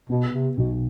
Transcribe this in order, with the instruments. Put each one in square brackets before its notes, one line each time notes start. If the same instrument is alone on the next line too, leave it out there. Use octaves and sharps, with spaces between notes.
[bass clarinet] B2 [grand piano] B3
[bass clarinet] C3
[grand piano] B1 [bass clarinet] B2